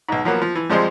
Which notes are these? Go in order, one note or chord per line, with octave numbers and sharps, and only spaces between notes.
B1 G#2
F3 F#3 A#3 B3
F3
E3
F2 F3 G3 G#3 C5